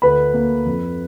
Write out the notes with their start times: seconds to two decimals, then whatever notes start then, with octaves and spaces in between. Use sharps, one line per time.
0.02 D2 B4 B5
0.34 A#3
0.66 F2